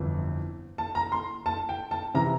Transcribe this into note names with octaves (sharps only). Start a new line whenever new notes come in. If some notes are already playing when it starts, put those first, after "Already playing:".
Already playing: G1 F2 E3
A5
A#5
C6
A5
G5
A5
C3 E3 A#5